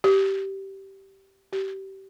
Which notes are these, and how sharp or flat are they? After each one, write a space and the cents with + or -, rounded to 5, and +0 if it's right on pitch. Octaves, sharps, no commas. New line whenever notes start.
G4 -15
G4 -25